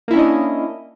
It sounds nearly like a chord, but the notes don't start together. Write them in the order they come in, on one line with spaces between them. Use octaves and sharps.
A#3 E4 C#4 D4 D#5